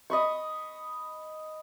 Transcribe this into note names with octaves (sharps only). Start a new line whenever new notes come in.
D#5 B5 C#6